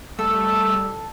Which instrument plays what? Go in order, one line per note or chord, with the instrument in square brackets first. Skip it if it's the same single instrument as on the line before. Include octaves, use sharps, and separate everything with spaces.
[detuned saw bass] G3 [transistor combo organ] A3 [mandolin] A4 [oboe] E6